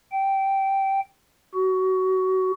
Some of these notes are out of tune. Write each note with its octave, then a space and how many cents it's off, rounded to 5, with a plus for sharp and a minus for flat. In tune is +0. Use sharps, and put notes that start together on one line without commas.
G5 -10
F#4 +25